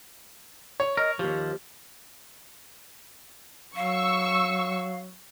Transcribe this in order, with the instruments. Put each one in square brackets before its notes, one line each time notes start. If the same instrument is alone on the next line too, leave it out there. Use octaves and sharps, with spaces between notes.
[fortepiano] C#5
[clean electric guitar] A#4 [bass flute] D#5
[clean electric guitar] D#2 F3 [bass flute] G4
[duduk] F#3 [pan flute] F5 [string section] C#6 E6